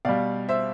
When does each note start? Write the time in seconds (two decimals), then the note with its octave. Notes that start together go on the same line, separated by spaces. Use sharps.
0.05 B2 G3 D5 F5
0.49 C5 E5